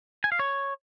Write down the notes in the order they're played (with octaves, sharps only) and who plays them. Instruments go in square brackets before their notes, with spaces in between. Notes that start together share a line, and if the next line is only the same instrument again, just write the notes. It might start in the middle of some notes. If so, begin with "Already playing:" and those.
[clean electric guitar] G#5
F5
C#5